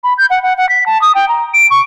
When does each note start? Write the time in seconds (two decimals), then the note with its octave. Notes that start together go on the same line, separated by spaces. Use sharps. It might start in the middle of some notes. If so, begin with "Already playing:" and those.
0.04 B5
0.18 G6
0.30 F#5
0.43 F#5
0.57 F#5
0.69 B6
0.86 A5
1.02 D#6
1.15 G5
1.29 A#5
1.54 D7
1.71 C#6